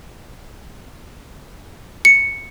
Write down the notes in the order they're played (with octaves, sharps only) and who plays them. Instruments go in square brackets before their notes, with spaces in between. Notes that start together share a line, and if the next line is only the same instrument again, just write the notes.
[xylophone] C#7